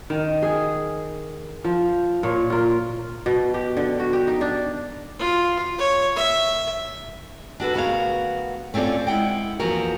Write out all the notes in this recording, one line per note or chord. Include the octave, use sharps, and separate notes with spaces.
D#3
G#4
F3
A#2 C#5
F4 A#4
B2
G4
D3
F#4
G4
D#4
D4
F4
C#5
E5
D4 F#4 A4 B4
D2 B3 F#4 G#4 A#4 F5
A3 C4 C#4 F4 A4 D5
G#3 E4 F#5 G5
E2 F3 A#3 F#4 A#4